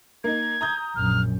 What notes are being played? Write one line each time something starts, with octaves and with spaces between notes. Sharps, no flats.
A#3 D#4 G#6
A#5 D#6 G6
A#1 F#2 F6